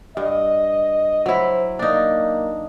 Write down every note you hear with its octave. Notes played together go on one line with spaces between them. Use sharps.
G2 D#5
F#3 E4 C5
A#3 D4 D#4